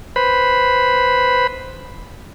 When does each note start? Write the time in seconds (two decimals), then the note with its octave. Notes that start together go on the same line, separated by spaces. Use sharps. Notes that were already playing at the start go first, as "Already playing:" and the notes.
0.16 B4 C5 B5